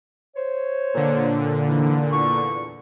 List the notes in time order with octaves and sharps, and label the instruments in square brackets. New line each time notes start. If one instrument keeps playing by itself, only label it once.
[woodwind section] C5 C#5
[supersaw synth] A#2 D3
[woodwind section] G#2 E3 F3
E2 C#6